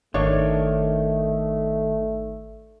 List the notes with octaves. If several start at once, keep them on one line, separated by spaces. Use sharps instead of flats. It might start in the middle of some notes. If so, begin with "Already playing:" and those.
G#1 D#3 A3 D4 C#5